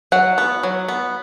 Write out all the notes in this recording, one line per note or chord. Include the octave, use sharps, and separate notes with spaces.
F#3 F#5
B3
F#3
B3